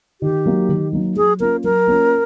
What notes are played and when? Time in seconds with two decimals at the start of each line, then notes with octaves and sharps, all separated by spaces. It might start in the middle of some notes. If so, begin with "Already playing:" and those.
0.21 D#3 G4
0.46 F#3 A#3 D#4
0.69 D#3
0.93 F#3 A#3 D#4
1.16 F#3 G#4
1.40 A#3 C#4 F4 A#4
1.64 F#3 A#4
1.87 A#3 C#4 F4